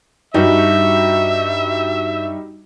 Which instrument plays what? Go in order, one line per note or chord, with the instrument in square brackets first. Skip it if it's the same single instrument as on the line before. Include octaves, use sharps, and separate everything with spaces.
[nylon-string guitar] G2 [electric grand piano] G3 D#4 F#4 [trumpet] E5